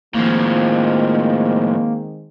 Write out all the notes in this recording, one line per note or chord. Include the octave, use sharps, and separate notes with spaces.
A2 D#3 F3 G#3 A#3 C4